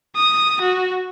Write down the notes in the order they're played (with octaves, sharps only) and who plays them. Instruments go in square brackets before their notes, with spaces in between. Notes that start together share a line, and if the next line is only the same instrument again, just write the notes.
[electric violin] D#6
F#4